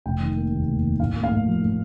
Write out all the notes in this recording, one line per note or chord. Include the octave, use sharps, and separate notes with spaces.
F1 G5
D#3
A#3
D#2
F1
D#3
A2 F5
A#3
F5
A2
F3
A2